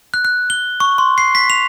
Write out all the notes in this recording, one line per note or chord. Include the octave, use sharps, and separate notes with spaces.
F#6
F#6
G7
C#6
C6
C7
B6
F7